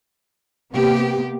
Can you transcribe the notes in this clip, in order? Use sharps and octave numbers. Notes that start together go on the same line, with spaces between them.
C3 A#3 B3 G4